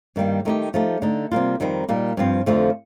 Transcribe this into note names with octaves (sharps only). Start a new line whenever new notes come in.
G2 D#3 G3 A#3
D#3 A3 D#4 G4
F3 A3 D#4 G4
D3 A3 D#4
C3 G3 A#3 F4
F2 D#3 G3 C4 D#4
A#2 G3 A#3 D#4
G2 F3 C4
F2 D3 F3 A3 C4